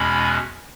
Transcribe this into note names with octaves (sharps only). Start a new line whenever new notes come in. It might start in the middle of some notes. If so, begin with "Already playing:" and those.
Already playing: E2 B2 G#3 C#4 B5